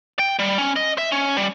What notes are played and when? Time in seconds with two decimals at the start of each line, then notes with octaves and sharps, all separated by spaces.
0.19 G5
0.39 G3
0.58 C#4
0.76 D#5
0.98 E5
1.12 C#4
1.37 G3